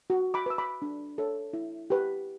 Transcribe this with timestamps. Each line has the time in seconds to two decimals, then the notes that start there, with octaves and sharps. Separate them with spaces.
0.10 F#4
0.34 B5 D6
0.46 B4 E6
0.58 B5 D6
0.82 D4
1.18 A4 C#5
1.53 E4
1.90 G4 B4